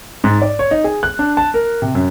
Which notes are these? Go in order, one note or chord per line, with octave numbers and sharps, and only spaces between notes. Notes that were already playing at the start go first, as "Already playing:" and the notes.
G#2
D5
C#5
D#4
G#4
F#6
D4
A5
A#4
C3
F#2